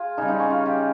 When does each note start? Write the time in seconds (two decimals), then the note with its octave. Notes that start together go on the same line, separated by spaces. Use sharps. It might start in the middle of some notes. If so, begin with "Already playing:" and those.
Already playing: F4 G#4
0.17 C#3 G3 D#4
0.28 D#4
0.40 C#4
0.50 F4
0.66 G4